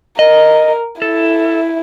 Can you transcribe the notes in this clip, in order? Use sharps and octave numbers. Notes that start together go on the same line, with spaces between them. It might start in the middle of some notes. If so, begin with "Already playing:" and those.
A#4 D#5
E4 A4